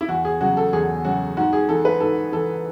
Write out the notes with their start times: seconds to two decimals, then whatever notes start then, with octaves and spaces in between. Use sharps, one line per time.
0.01 E4
0.08 E2 F#4
0.25 G#4
0.40 C#3 F#3 F#4
0.57 A4
0.73 E2 G#4
1.05 C#3 F#3 F#4
1.37 G#2 F#4
1.53 G#4
1.69 E3 A4
1.85 B4
2.00 G#2 A4
2.32 E3 A4